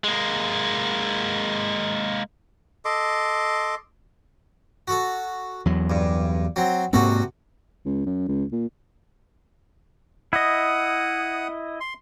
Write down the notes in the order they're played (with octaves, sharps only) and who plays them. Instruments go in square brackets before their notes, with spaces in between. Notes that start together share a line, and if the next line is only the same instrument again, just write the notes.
[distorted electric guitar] G#3 A#3
[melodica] A4 D#5 C6 D6
[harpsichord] F#4 A4
[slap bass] E2 F#3
[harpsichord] G2
F#3 C4
[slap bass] G#2 A#3 C4 [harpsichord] C3 F#4 A4
[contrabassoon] C#2
F#2
C#2
A#2
[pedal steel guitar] E4 D#5 [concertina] F#5 D#6
[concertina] C6